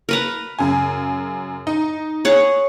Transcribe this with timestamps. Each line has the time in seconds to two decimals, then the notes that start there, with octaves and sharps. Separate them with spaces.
0.09 A#4 B4 A#5
0.59 F#2 C#3 G#5
1.67 D#4
2.25 G#4 C#5 F#5